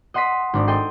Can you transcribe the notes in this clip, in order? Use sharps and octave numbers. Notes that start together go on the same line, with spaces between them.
D#5 F#5 C6 D#6 B6
G#1 D4
A4 D#5 G5 C6